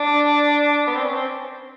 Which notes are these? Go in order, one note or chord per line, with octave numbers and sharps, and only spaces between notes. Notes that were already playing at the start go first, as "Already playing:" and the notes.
Already playing: D4
B3
C4
C#4
C4